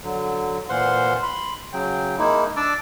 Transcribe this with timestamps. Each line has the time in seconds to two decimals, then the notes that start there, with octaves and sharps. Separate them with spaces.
0.03 D3 F#3
0.69 A#2 E3 C5 F5 F#5 C6
1.23 B5 C6
1.73 C#3 F#3 G5
2.18 G#3 A#3 D#4 E4
2.56 D4 D5 D6 E6